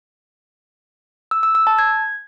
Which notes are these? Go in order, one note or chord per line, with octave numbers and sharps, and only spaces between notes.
E6
E6
E6
A5
G#6